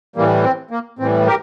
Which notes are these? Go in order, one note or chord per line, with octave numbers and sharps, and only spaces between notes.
A2 E3 G3 A#3
C4
A#3
A2 E3 G3 C4
G4 A#4